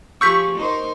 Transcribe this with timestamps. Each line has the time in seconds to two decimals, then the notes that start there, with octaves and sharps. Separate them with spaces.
0.21 F3 G4 G#4 C#6 E6 G6 B6
0.55 D#4 A#4 C5